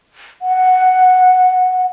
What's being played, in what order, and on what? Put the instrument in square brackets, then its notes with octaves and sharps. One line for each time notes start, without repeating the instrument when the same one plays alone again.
[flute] F#5